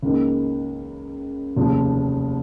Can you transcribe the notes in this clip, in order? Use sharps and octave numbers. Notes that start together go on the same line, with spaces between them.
C#2 C#3 A#3 D#4
F1 D#2 C#3 F3